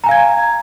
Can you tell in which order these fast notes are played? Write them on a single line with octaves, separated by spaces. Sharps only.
A#5 G#5 F5 G#6